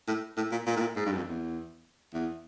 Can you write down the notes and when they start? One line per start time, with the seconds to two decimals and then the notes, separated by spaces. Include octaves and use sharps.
0.08 A2
0.37 A2
0.51 A#2
0.66 A#2
0.76 A2
0.80 A#2
0.96 G#2
1.06 G2
1.12 F#2
1.17 F2
1.28 E2
2.13 E2